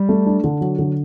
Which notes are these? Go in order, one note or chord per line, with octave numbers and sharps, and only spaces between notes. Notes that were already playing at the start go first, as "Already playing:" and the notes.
Already playing: G3
A3
D4
D3
F#3
D3